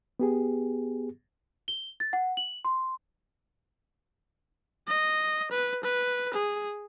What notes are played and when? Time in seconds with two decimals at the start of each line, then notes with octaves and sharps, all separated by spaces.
0.19 B3 G4 G#4
1.68 G7
2.00 A6
2.13 F#5
2.37 F#7
2.65 C6
4.88 D#5
5.51 B4
5.84 B4
6.33 G#4